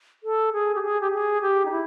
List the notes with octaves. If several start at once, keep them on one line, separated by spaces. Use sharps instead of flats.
A4
G#4
G4
G#4
G4
G#4
G4
D#4
E4